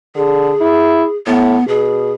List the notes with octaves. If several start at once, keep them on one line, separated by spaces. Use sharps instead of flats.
D3 G#4
E4
A2 B3
B2 G#4